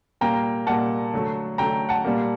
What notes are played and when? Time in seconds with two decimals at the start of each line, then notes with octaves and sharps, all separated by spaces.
0.21 A#2 G3 A#3 G5 A#5
0.67 A#2 G3 A#3 F#5 A5
1.14 D3 F#3 A3
1.58 D3 F#3 A3 G5 A#5
1.89 F#5 A5
2.05 A#2 G3 A#3